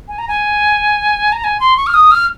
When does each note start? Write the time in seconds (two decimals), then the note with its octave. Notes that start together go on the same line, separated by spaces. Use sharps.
0.08 G#5
0.18 A#5
0.28 G#5
1.32 A#5
1.44 G#5
1.60 C6
1.77 C#6
1.87 F6
1.94 D#6
2.11 F6